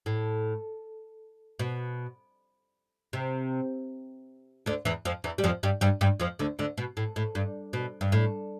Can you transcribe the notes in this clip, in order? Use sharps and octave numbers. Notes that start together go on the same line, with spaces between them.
A2
B2
C3
D2 D3
E2 E3
F2 F3
E2 E3
G3
F2 F3
G2 G3
G2 G3
G2 G3
F2 F3
D2 D3
D2 D3
B2
A2
A2
G2
B2
G2
A2